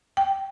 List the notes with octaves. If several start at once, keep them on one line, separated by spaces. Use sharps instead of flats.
G5